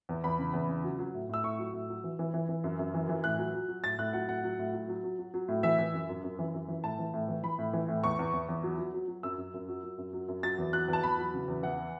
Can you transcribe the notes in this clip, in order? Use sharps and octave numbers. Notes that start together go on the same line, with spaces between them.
E2
E2 B5
C#3
E2
C#3
F#3
F#3
A2
A2 E6
A2 C#6
F#3
A2
F#3
E3
E3
E3
E3
F#2
F#2
E3
E3
A2 F#6
F#3
F#3
F#3
A2 A6
A2 F#6
F#3 F#5
A2 F#5
F#3
A2
F#3
F#3
F#3
F#3
F#3
A2
E3 E5
E3
F#2
F#2
F#2
E3
F#2
E3
A2 A5
E3
A2
E3
E3 B5
A2
E3
A2
E2 C#6
E2
E2
E2
F#3
F#3
F#3
F#3
F#2 E6
F#2
F#2
F#3
F#3
F#2
F#3
F#2
F#3 A6
E2
F#3 F#6
E2 A5
E2 B5
F#3
C#3
E2
E3 F#5